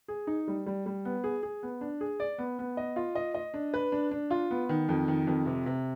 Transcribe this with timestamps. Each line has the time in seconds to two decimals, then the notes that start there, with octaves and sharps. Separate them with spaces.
0.08 G#4
0.27 D#4
0.47 G3
0.66 G3
0.86 G3
1.05 B3
1.24 G#4
1.43 G#4
1.63 B3
1.81 D4
2.01 G#4
2.20 D5
2.38 B3
2.59 B3
2.77 D#5
2.96 F4
3.15 D#5
3.34 D#5
3.54 D4
3.74 B4
3.92 D4
4.11 D4
4.31 F4
4.51 B3
4.69 D#3
4.89 F2
5.08 D#3
5.27 F2
5.46 C3
5.66 C3